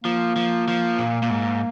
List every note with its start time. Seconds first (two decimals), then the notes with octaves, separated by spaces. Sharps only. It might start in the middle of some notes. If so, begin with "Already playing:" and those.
0.04 F3 A#3
0.36 F3
0.68 F3
0.99 A#2
1.22 A#2
1.30 G#2